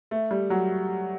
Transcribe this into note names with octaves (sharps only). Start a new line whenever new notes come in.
A3
G3
F#3